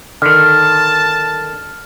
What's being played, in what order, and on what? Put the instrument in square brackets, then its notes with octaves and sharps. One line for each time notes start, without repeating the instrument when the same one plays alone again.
[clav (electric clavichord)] D3 D#3 [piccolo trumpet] A5 [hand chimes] F6